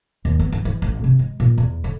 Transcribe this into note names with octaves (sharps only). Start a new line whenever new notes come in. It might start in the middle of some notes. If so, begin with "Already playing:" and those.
D#2
B3
E3
E3
A1
C3
G#3
A#2
E2
D3